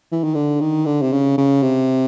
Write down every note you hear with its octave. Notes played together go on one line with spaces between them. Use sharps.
E3
D#3
D3
D#3
D3
C3
C#3
C#3
C3